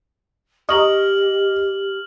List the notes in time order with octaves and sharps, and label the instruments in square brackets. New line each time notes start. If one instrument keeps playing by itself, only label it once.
[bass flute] G4 [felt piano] D#5 [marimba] A#5 C#6 D#6 [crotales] F6 F#7